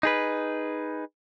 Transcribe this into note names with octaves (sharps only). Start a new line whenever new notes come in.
D#4 G#4 B4